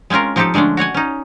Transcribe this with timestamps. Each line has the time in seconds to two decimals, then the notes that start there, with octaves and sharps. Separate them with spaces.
0.10 G#3 C4 C#4 F4 A#4
0.36 F3 C4 D#4 G4 A4
0.54 D3 G#3 A3 C#4 D4
0.77 F#4 C#5 F#5 G#5
0.94 C#4 D#4